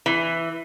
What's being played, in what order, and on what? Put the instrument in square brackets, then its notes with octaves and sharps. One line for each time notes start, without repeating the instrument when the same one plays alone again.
[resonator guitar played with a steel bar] E3